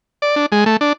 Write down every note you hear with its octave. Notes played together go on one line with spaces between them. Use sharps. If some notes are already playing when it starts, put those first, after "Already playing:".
D5
D4
G#3
A3
D4